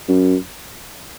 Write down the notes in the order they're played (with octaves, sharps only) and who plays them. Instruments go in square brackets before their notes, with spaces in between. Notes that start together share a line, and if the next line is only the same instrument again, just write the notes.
[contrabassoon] F#2